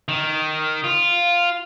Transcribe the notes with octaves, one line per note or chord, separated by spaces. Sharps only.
D#3
F4